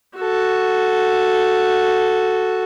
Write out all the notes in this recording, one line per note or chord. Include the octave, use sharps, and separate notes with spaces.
F#4 A4